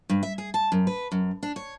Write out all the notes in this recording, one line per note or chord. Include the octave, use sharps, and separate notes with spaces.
G2
E5
G#4
A5
F#2
B4
F#2
D4
C#5